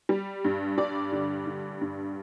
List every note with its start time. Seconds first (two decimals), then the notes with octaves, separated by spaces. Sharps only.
0.09 G3
0.44 G2
0.78 G3 D5
1.12 D3
1.46 D3
1.81 G2